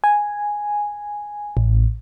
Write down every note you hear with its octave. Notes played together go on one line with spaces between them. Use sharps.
G#5
A1